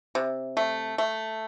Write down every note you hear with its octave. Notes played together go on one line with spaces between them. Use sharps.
C3
A3
A3